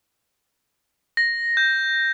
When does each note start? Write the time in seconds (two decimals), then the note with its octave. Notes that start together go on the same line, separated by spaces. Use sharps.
1.17 A#6
1.57 G6